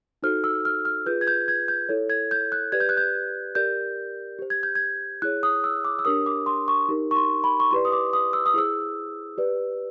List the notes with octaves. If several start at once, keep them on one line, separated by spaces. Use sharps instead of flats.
D#4 F#4 A4 C5 F6
E6
F6
F6
F4 G#4 B4 G6
G#6
G6
G#6
G6
E4 A4 C#5
G#6
G6
F#6
G4 B4 D5 G#6
G6
F#6
G6
G4 A#4 D5 G6
G4 C5
G#6
G6
G#6
E4 G#4 C#5 F#6
D#6
E6
D6
E6
D4 G4 A#4 C#5 D#6
D6
C6
C#6
D#4 G4 A#4
C#6
C6
B5
C#6
E4 G4 B4 D5 C6
D#6
D6
D#6
E6
D#6
E4 G#4 C5 E6
G4 B4 D5